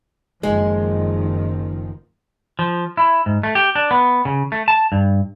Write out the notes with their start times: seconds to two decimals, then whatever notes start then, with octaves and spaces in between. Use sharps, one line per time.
0.43 F#1 D#3 F3 G#3
2.59 F3
2.97 E4
3.26 G#2
3.43 A3
3.55 G4
3.75 D4
3.91 B3
4.25 C#3
4.52 A3
4.68 A5
4.92 G2